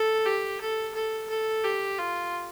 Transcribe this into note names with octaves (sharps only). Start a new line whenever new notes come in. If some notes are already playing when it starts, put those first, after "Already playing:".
Already playing: A4
G4
A4
A4
A4
G4
F4